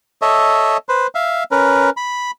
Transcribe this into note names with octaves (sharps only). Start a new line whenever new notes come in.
A4 C#5 D#5 E5
B4 C5
E5 F5
C#4 A#4 B4
B5